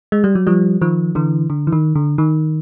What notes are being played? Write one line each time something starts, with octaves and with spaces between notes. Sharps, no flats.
G#3
G3
F#3
F3 G3
D#3 F3
D3 E3
D3
E3
D#3
D3
D#3